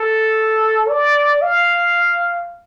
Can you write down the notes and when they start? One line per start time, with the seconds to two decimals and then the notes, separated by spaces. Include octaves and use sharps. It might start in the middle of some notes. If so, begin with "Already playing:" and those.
Already playing: A4
0.89 D5
1.42 F5